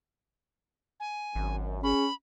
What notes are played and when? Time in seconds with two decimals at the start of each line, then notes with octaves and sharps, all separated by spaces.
1.00 G#5
1.35 G#1 F#2
1.83 C#4 G#4 B5